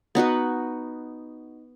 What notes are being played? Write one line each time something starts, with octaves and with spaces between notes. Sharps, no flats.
B3 D#4 F#4 B4